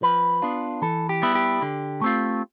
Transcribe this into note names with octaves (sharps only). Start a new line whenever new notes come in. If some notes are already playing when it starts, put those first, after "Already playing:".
F3 B4
B3 D4 F4
E3 A4
G4
G3 B3 E4
G4
D3
A3 C4 F4